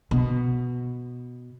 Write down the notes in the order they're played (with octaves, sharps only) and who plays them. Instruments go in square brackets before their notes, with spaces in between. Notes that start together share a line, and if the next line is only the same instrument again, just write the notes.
[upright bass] B2